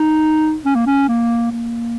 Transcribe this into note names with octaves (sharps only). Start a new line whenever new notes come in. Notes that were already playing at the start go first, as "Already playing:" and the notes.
Already playing: D#4
C#4
A#3
C#4
A#3
A#3